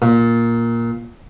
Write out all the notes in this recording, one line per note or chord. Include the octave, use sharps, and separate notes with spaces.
A#2